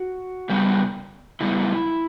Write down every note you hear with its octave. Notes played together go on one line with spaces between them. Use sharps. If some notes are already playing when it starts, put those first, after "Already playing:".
Already playing: F#4
C#3 G3 B3
C#3 G3 B3 E4